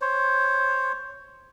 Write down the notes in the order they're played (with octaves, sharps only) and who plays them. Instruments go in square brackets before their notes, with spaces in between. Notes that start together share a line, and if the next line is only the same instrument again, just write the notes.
[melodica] C5 C#5